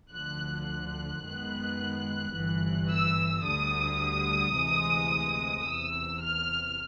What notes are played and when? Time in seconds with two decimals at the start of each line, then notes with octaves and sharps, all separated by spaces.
0.12 D2 D3 F3 F#6
0.67 F#6
1.22 F#2 D#3 G#3 B3
2.34 G1 G2 E3
2.89 E6
3.44 D2 D3 G3 D#6
4.55 D2 C3 E3 G#3
5.66 E2 C3 E3 E6
6.22 F6